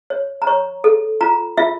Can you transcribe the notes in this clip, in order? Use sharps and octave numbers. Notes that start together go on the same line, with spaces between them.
C#5
A#5
C#5 C#6
A4
F4 A#5
F4 E5